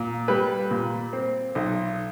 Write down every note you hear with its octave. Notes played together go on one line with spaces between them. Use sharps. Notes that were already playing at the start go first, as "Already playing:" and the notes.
Already playing: A#2
G3 B4
A#2
C4
B1